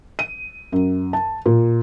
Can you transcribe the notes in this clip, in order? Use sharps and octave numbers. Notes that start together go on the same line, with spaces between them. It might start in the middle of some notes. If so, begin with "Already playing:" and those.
D#7
F#2
A5
A#2